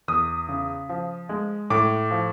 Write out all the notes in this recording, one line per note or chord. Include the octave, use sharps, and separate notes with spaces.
E2 D#6
C#3
F3
G#3
A2 D6
F3